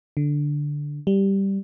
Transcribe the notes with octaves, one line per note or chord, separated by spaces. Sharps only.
D3
G3